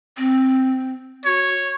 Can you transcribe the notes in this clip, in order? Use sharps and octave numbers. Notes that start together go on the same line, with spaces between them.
C4
F#4 C#5